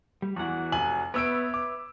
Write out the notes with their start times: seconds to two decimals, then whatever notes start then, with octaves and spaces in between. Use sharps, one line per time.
0.22 G3
0.36 E2 E3 F#4 F#5
0.72 F1 G#5 F#7
1.14 B3 B4 C#5 E5 E6 D7
1.54 D6